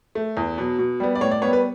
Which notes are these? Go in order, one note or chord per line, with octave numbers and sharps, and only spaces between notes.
A3
E2
B2 F#3
B2
G3 B3
D5
A2 C#5
D5
G3 B3 C#5
B4